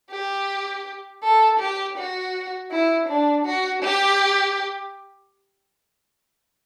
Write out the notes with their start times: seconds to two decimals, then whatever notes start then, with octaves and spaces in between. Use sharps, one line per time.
0.11 G4
1.23 A4
1.60 G4
1.98 F#4
2.71 E4
3.09 D4
3.45 F#4
3.82 G4